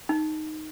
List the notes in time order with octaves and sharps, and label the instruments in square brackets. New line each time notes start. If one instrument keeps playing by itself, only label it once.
[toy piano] D#4